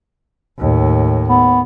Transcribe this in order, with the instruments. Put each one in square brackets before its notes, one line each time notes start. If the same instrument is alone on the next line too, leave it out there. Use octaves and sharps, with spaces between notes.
[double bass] D#2 A2
[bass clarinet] B3